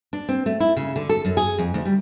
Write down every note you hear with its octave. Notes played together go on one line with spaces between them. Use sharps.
D4
C4
A3
E4
C#3
D3
A4
F#2
G#4
F2
D2
G3